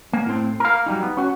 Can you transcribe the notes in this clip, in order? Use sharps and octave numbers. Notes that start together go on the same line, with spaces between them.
A#3
A2 C4
A#4 F5
F#3 G3 D#4
B3
C#4 F#4